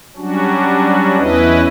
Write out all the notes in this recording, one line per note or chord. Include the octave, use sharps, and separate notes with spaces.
F#3 G3 C#4 D4 F#4
E2 C#4 E4 B4 D#5